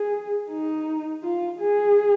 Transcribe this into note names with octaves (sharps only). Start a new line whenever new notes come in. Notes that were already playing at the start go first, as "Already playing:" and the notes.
Already playing: G#4
D#4
F4
G#4